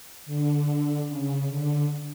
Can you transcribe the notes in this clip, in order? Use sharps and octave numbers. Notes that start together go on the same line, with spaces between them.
D3
C#3
D3